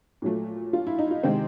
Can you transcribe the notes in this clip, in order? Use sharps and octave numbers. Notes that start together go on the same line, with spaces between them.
A#2 F#3 A3
F4
E4
D#4
F4
C3 D#3 G#3 C4